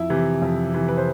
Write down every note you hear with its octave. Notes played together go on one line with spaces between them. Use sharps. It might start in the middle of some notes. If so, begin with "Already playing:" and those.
Already playing: F2 E4 E5
C3 E3
F2
C3 E3
B4
C5